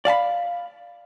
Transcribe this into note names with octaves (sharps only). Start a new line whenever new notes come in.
D5 F5 A5 B5